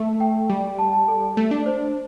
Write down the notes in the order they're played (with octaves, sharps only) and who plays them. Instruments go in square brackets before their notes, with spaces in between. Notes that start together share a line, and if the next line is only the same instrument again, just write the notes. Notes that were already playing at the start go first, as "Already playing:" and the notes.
Already playing: [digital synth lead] A3
[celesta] G5
[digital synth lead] G3
[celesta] A5
A5
A4
[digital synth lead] A3
D4
[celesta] C5